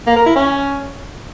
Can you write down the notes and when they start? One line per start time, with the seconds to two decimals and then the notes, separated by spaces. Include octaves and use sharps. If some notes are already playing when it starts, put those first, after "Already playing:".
0.06 A#3
0.16 A#4
0.26 E4
0.36 C#4